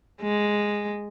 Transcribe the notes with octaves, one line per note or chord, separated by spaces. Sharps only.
G#3